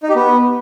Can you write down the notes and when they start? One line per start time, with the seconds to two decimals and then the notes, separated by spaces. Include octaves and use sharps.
0.03 D#4
0.09 G4
0.16 B3